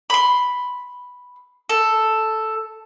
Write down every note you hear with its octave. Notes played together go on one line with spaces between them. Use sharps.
B5 C6
A4